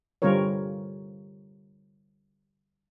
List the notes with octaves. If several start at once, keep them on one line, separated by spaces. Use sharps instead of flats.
D3 G3 C4 F4 A#4 C#5